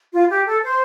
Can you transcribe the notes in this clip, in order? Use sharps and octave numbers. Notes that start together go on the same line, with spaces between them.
F4
G4
A4
C5